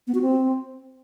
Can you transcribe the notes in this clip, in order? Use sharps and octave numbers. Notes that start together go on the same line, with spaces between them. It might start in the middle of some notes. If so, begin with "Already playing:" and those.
B3
F#4
C4